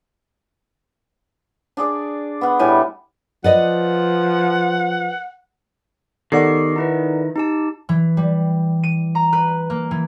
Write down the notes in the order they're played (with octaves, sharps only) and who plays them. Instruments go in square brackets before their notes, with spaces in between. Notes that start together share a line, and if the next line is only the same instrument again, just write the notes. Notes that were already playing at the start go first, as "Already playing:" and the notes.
[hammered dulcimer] D4 G#4 D5
B3 F#5
A2 G3 E4 G#5
[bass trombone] F3 [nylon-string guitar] B4 D5 D#5 [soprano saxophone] F#5
[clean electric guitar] D#3 [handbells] B3 G4 C7 [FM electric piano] A4 D5 F#5
[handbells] D#4 E4 B4
D#4 G4 A5
[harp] E3
G3
D#7
A#5
B4
A#3
E3